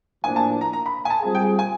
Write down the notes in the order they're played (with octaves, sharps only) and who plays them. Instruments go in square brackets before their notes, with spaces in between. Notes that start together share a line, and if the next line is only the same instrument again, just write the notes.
[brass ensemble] A2 F3 A#3 D4 [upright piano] G#5
[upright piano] A5
A#5
A#5
B5
G#5
A5
[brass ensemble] G3 C4 F4 G#4 [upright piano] G#5
[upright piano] G5
G#5